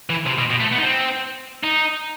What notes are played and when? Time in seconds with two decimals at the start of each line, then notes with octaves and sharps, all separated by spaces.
0.10 E3
0.26 C3
0.38 B2
0.50 B2
0.60 A3
0.72 B3
0.78 D#4
0.83 C4
1.63 D#4